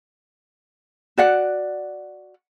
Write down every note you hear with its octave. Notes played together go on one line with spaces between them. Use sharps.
F#4 D5 F#5